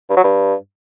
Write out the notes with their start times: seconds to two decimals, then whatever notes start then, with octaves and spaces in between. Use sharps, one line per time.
0.09 G2
0.17 F#3
0.24 G2